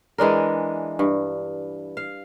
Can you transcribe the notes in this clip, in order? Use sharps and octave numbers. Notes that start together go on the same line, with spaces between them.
E3 G#3 D4 A#4
G2
F5